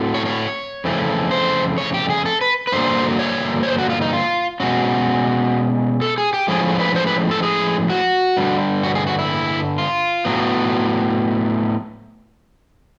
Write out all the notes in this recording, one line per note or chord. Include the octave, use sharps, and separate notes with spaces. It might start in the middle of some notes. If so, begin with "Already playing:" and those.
Already playing: A2 F#3 A3 C4
C#5
C#5
F2 C#3 E3 A3 C#4
C5
C#5
G4
G#4
A4
B4
B4
G2 D3 F#3 A#3 C5
C#5
C#5
C5
F#4
F4
D#4
F4
B2 G#3 C#4 F#4
A4
G#4
G4
A2 F3 G#3 C#4 G#4
B4
C5
B4
A4
G#4
F#4
G2 D3 G3
F#4
G#4
F#4
E4
F4
A2 F#3 B3